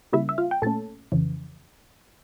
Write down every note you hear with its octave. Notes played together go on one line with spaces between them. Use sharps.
C#3 G3 A#3 E4 E5
E5
F4 F5
G5
A#2 A3 C#4 A4 A5
F2 C#3 E3